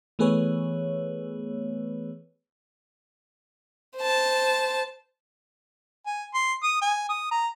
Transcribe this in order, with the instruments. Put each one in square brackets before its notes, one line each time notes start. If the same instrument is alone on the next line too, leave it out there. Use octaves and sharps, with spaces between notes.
[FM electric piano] E3 A3 B3 G#4 B4 C#5
[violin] C5 A5
[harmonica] G#5
C6
D#6
G#5
D#6
A#5